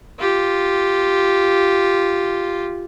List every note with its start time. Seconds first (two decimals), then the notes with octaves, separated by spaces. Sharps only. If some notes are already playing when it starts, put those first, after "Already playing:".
0.19 F4 G4